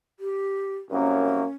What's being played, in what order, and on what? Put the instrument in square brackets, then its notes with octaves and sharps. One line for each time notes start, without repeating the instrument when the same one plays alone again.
[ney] G4
[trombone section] C2 F#2 A#3 [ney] C#4